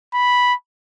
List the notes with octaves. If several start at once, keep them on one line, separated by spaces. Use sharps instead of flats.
B5